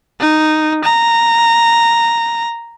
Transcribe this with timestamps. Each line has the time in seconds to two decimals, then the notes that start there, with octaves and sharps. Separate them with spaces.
0.20 D#4
0.84 A#5